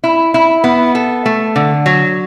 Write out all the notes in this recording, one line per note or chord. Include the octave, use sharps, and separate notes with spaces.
E4
E4
B3
A4
A3
D3
F#3